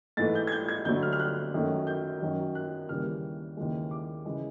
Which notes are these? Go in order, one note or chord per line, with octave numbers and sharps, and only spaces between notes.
G#2 E3 A3 A6
G6
G#6
G6
G#6
D2 D3 F#3 A3 G6
F6
F6
F#6
F#2 D#3 F#3 A3
G6
F#2 D#3 F#3
F#6
D#2 C#3 E3 G3 A#3 F6
D#2 C#3 E3 G#3
D6
C#3 E3 G#3